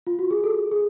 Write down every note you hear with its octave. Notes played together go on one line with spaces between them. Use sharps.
F4
F#4
G#4
A4
G#4